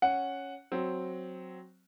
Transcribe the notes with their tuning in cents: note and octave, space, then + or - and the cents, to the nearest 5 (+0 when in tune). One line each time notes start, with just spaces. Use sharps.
C#4 +0 F#5 +0
F#3 +0 C4 +0